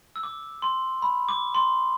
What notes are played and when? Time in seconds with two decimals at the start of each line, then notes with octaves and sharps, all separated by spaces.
0.16 E6
0.23 D6
0.62 C6
1.02 B5
1.29 D6
1.54 C6